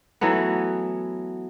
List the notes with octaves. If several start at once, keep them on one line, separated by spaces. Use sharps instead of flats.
E3 F#3 A3 B3